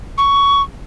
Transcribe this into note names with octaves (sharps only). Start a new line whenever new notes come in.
C#6